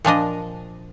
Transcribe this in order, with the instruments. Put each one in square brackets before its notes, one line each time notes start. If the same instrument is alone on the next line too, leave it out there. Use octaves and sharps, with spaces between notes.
[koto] A#2 F3 D4 D#5